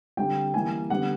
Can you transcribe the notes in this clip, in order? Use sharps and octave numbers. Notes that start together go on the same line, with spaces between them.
D3 G3 C4 G5
E3 G3 A#3 G#5
D3 G3 B3 F#5